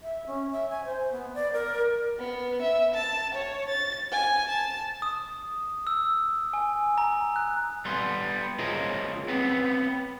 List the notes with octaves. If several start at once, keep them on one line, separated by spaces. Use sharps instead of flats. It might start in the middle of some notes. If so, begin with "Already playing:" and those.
E5
C#4
E5
G#5
C5
B3
D5
A#4
B3
E5
A5
C#5
A6
G#5
A5
D#6
E6
G#5
A#5
F#6
G3 B3 C6
F4 G#4 A#4 C5 C#5 D#5
B3 C4 B4